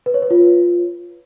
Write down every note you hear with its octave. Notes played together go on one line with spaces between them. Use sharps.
B4
C#5
B4
F4